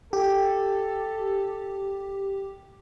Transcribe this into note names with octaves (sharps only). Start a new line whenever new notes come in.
G4 A4